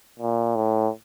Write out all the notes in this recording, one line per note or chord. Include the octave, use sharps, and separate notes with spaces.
A#2
A2